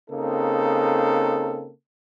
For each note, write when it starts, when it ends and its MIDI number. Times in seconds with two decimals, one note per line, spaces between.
0.11 1.71 49
0.11 1.71 58
0.11 1.71 60
0.11 1.71 63
0.11 1.71 69